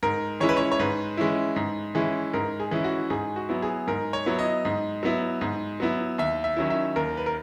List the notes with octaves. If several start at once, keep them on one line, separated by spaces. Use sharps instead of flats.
G#2 A#4
E3 G#3 C#4 E4 C#5
B4
C#5
C#5
G#2 B4
E3 G#3 C#4 E4
G#2
E3 G#3 C#4 E4
G#2 A#4
G#4
E3 G#3 C#4 E4
F#4
G#2 G#4
F#4
F#3 B3 E4
G#4
G#2 A#4
C#5
F#3 B3 E4
D#5
G#2
F#3 B3 E4
G#2
F#3 B3 E4
D#2 E5
E5
D#3 F#3 C#4 E4
E5
D#2 A#4
B4
A#4